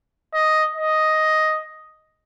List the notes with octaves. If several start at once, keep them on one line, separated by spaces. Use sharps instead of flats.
D#5
D#5